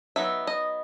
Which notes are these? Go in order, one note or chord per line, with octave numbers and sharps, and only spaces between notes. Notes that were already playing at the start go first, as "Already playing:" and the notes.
F#3 B3 D#4 E5
D#5